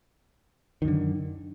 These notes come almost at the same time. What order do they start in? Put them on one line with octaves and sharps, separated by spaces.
D#3 F#2 D3